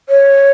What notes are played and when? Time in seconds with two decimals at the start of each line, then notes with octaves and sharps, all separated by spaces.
0.09 C#5